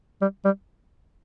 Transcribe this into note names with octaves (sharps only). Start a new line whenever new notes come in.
G3
G3